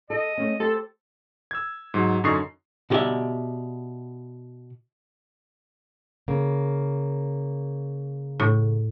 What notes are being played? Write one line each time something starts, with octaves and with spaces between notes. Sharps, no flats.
A4 D#5
A3 C4 C#4
G4 A4 C5
E6 G#6
G#2 F#3
F#2 D3 D#4 C#6 D#6 C7
B2 F#4 G4 D5 E5
C#3 A#3
A2